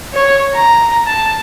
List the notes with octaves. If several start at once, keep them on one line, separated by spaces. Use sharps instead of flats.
C#5
A#5
A5